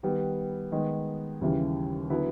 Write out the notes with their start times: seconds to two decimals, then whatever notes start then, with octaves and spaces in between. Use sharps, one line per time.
0.03 D#3 G3 B3
0.72 D#3 G#3 B3
1.41 D#2 C#3 E3 G3
2.10 D3 F#3 B3 E4